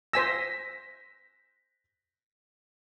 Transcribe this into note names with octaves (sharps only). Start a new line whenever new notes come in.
C5 G#5 E6 A#6 B6